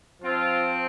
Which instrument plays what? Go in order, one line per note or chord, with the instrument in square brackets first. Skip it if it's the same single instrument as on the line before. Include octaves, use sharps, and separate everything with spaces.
[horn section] F3 C4 F4